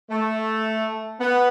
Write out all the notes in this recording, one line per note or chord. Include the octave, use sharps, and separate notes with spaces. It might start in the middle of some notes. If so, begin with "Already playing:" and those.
A3
B3